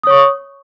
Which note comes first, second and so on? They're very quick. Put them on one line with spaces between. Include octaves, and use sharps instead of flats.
D#6 C#5 C#6